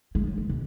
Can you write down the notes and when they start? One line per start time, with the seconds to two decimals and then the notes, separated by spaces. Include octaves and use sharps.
0.15 G#3
0.27 F#3
0.38 D#3
0.49 B2